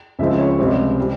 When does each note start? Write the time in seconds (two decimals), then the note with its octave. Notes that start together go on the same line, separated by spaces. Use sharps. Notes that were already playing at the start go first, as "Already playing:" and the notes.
0.19 C#2 C#3 F3 C4 E5
0.38 C#5
0.59 C#2 C3 G3 C4
1.00 G3